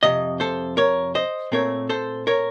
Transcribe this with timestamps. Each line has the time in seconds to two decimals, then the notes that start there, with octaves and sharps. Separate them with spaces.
0.03 F2 C3 D#5
0.40 A4 C5
0.77 A#4 C#5
1.15 C5 D#5
1.52 A#2 A3 C4 A#4 C#5
1.90 A4 C5
2.27 A#4 C#5